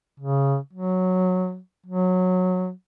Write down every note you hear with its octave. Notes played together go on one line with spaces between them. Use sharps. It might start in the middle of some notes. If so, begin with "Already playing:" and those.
C#3
F#3
F#3